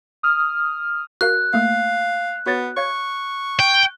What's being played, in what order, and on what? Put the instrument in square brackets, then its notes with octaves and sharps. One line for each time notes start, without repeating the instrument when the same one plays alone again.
[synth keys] D#6 F6
[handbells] F#4 A#4 F5 [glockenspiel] F#6
[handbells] A3 A#3 [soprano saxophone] F5
[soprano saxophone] B3 [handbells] F#4 C#5 A6
[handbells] C#5 F5 G#6 [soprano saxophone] C#6
[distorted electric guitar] G5